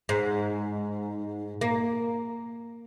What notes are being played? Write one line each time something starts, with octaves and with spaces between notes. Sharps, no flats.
G#2
A#3